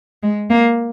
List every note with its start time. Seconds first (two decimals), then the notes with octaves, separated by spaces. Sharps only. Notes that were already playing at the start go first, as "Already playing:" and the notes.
0.23 G#3
0.50 A#3